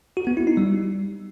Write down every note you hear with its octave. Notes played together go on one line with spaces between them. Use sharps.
F#4
B3
E4
D#4
G3